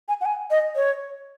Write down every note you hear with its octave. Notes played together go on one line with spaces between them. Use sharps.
G#5
F#5
G#5
D#5
C#5